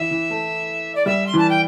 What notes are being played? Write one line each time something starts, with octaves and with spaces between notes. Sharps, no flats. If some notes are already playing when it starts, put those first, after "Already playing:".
Already playing: E3 E5
E3
A3
D5
G3 E5
C6
E3 A5
G5